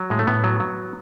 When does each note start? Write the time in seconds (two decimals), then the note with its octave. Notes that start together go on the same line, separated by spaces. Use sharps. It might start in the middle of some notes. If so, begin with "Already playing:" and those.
Already playing: F#3
0.10 A2 G#3
0.19 A3
0.27 A2 B3
0.44 F#3
0.60 F#3